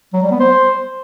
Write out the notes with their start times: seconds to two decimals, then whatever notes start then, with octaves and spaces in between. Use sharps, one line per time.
0.13 F#3
0.22 G3
0.31 B3
0.40 C5